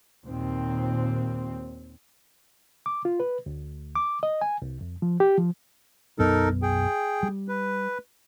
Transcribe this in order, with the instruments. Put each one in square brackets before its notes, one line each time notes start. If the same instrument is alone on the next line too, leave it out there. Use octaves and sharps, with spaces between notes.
[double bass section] D#2 A#2 C4
[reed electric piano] D6
F4
B4
D2
D6
D#5
G#5
C2
F2
F3
G4
F3
[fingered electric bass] B1 F#2 B3 [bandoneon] D#4 A4 A#4
[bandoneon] G#4 G5
[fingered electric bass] G3
[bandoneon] B4